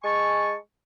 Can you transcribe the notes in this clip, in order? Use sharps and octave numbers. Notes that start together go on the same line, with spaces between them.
G#3 G#5 A5 C#6